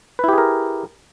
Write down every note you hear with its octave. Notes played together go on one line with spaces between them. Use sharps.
E4 G4 G#4 A#4 B4